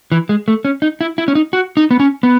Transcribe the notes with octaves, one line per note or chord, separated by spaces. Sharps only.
E3
G#3
A3
C#4
D#4
E4
E4
C#4
D#4
F#4
D#4
B3
C#4
B3